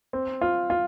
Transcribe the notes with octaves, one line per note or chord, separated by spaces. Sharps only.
C4
F4
F4